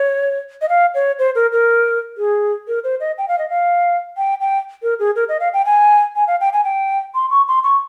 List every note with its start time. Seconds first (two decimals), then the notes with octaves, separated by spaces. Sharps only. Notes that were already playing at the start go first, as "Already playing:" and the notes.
Already playing: C#5
0.62 D#5
0.69 F5
0.95 C#5
1.19 C5
1.35 A#4
1.52 A#4
2.18 G#4
2.68 A#4
2.84 C5
3.00 D#5
3.18 G5
3.28 F5
3.38 D#5
3.49 F5
4.17 G5
4.41 G5
4.83 A#4
4.99 G#4
5.16 A#4
5.29 D#5
5.40 F5
5.53 G5
5.66 G#5
6.16 G#5
6.27 F5
6.41 G5
6.53 G#5
6.64 G5
7.15 C6
7.31 C#6
7.48 C6
7.64 C#6